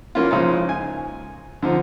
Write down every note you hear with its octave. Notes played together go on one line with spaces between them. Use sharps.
E3 A#3 C#4 F4
C#3 F3 G#3 D#4
G#5
D3 F3 D#4